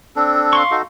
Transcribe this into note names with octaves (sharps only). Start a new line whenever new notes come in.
C4 D4 A4
F5 C6 C#6
D#4 F#4 A4